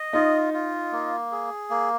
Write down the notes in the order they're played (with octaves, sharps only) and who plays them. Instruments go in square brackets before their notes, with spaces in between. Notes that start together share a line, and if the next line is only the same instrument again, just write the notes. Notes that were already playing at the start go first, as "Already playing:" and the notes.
Already playing: [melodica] D#5
[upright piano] D#4 [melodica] F4
[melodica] F4
A#3
G#4
A#3